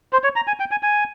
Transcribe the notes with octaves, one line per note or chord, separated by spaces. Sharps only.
C5
C#5
A#5
G#5
G5
G#5
G#5